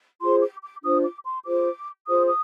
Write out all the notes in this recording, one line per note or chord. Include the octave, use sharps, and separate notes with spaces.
F4 G#4 C5 C6
D6
D6
D4 F4 C5 D#6
D6
C6
F4 G#4 C5 D6
F4 G#4 C5 D#6
D#6